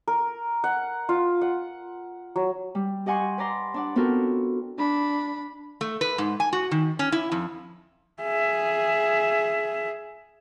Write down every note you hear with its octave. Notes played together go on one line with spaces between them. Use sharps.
A#4
F#5
F4
F#5
F#3
G3
G4 D#5 F#5 G#5 C6 C#6
B4 D5 A#5 C6
D4 D5 F#5
B3 C4 F4 F#4 A4 A#4
D4 B5
A3
B4
G#2
G#5
F#4
D#3
C#4
E4
F2
G#4 E5